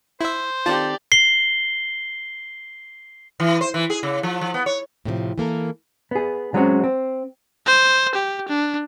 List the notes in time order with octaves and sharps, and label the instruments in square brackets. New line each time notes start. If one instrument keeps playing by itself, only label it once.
[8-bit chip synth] E4 E5 [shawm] C5
[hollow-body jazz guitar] D#3 C4 A4 [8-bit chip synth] F4 A5 [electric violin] G4 D5
[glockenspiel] C7 G7
[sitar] E3
C5
E3
G#4
C#3
F3
F3
B3
C#5
[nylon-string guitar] A2 C3 D#3 F3
E3 A#3 A4 A#4
[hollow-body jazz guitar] B3 G#4
F#3 G#3 C4 C#4 F4 F#4
C4
[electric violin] C5
G4
D4